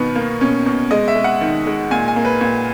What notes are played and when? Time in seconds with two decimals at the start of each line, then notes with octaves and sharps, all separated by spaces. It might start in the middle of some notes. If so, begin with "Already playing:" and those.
Already playing: B2 D#3 B3
0.16 A#3
0.41 B2 C#4
0.66 B2
0.91 G#3 D#5
1.08 E5
1.16 G#3
1.24 F#5
1.41 D#3
1.67 G#3
1.91 A#2 G#5
2.08 G#5
2.16 A#3
2.25 B4
2.41 A#2